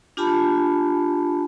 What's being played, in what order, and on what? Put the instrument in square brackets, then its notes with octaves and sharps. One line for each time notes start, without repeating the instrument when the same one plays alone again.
[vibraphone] D4 F4 G4 G#5 A5 B5